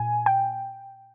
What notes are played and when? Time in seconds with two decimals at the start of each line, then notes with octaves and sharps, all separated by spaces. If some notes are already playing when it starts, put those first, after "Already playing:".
Already playing: A#2 G#5
0.26 G5